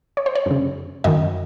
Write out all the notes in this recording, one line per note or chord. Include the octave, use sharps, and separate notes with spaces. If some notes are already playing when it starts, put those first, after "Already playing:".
C#5
C5
C#5
F#2 C#3
F#2 D#3 D#5